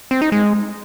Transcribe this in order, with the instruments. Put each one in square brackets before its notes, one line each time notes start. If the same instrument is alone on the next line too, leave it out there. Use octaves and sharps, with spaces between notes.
[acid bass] C4
D#4
G#3